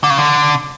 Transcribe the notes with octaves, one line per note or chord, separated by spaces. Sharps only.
D3
C#3
D3